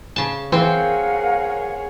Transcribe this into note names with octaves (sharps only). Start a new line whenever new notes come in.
C#3 A5
E3 C4 G#4 A#4 C5 C#5 F5 F#5